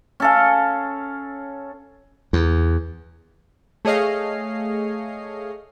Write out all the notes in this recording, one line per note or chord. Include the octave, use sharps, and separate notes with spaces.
C#4 A4 F5
E2
A3 G#4 C#5 D#5 F5 C7